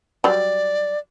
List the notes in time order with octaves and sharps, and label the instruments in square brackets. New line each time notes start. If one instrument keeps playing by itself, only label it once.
[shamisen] F#3 G3 [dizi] D5